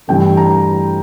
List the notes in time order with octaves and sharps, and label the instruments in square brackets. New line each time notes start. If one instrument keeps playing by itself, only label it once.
[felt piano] G2 E3 A3 G5
A#5